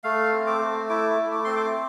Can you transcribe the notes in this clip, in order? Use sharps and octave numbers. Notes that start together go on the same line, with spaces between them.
A3 F5
C4
D6
A3
E4 D6
A3
D6
C4 C6
D6